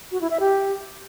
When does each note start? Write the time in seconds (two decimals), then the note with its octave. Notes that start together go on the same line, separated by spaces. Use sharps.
0.12 F#4
0.21 E4
0.31 E5
0.40 G4